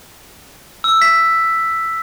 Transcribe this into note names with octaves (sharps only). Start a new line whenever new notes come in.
E6
B6